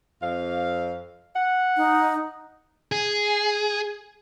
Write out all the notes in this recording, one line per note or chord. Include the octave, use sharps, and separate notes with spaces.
F2 F5
F#5
D#4
G#4